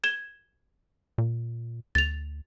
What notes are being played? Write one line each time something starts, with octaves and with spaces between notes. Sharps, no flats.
G#6 E7 G7
A#2
D2 A6 F7